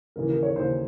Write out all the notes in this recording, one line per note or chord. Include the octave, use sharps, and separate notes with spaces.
D#2 C#3 E3 A#4
A#4
C#5
D#2 C#3 E3 C5